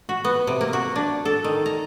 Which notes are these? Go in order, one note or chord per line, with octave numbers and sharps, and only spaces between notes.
F#4
B3
C3
A#3
F#4
D4
A4
D#3
A#5